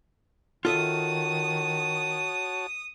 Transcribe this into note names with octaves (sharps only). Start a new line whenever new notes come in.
D#3 F4 F#4 A4 C#5 E5 A5 D#6